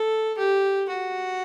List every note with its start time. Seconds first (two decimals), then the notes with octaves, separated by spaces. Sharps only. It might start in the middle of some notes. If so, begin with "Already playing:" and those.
Already playing: A4
0.38 G4
0.90 F#4